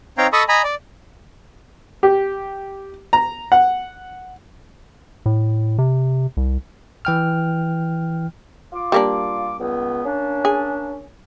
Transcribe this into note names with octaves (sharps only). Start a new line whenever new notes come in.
C4 D#4 C#5 F5 G5 A#5
A4 D#5 A5 B5 C#6 D#6
D#5 G#5 A#5 B5
D5
G4
A#5
F#5
A2
C3
C2
E3 G5 F6
F4 D6
G3 A#3 D4
C#2 B3
A#3 C#4 D4
G#4